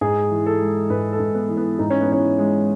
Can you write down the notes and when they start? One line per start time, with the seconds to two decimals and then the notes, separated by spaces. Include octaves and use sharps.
0.01 G#2 G#4
0.31 E3
0.46 A4
0.61 G#3
0.90 G#2 B4
1.12 A4
1.20 G#2
1.35 B3
1.49 E3
1.57 B3
1.79 G#2 D#4
1.90 C#4
2.01 B3
2.09 E3 C#4
2.38 G#3